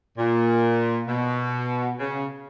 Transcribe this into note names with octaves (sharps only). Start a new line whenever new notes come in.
A#2
B2
C#3